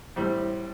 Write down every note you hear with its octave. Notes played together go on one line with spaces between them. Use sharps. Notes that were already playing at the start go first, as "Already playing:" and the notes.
A2 G3 C4